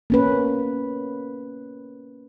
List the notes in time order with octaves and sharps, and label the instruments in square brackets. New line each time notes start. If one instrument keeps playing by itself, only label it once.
[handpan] A#3 C#4 B4